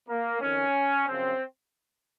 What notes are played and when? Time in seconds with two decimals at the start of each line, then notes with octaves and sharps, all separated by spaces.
0.08 A#3
0.41 F2 D#3 C#4
1.08 F#2 C#3 F3 C4